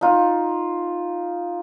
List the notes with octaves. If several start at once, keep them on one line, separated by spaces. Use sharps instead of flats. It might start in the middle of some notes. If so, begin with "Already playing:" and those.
D#4 F4